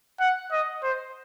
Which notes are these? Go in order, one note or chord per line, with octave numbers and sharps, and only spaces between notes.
F#5
D#5
C5